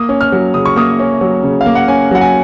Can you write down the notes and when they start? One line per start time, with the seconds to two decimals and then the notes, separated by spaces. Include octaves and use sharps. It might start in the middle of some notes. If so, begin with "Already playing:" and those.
Already playing: A#3 D#6
0.09 C#4
0.21 F6
0.32 F#3
0.54 C#3 D#6
0.65 C#6
0.76 A#3 D#6
0.99 C#4
1.21 F#3
1.43 C#3
1.61 F5
1.66 A#3
1.75 F#5
1.88 C#4 G#5
2.11 F#3 F#5
2.21 G#5